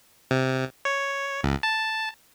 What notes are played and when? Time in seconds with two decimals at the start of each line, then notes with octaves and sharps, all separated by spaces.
0.31 C3
0.85 C#5
1.44 C#2
1.63 A5